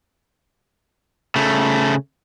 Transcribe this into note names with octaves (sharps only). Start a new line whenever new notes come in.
C#3 A3